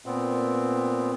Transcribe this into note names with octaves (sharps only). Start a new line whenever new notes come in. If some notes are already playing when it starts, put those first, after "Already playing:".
A#2 B3 C4